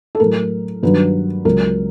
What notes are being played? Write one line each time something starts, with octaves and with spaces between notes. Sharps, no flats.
A4
A2 F#3 A#4
G2 D#3 F#3 B4
C#2 C#3 F#3 A#4